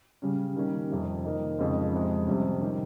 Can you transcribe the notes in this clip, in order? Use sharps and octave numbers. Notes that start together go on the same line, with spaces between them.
C#3 G3 C#4
D#3 G3 A#3 C#4
F2 C3 G3
D#3 A#3 D#4
F2 C#3 G#3 C4 D#4
F2 C3 F3 G#3
F2 C3 G3 C#4
D#3 G3 C#4